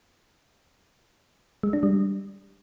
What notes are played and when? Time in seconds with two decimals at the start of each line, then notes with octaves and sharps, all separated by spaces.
1.63 G#3
1.73 D4
1.83 G3